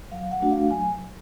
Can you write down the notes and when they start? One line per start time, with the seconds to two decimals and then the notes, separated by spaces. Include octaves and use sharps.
0.12 F#3 F5
0.31 F#5
0.41 A3 D4 F#4
0.51 F5
0.71 F#3 G#5